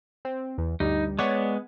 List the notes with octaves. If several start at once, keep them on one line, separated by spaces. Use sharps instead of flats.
C4
E2
D2 G2 G3 D#4
G#3 B3 C#5 D5 F#5